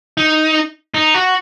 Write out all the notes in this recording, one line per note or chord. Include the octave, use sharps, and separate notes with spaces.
D#4
D#4
F#4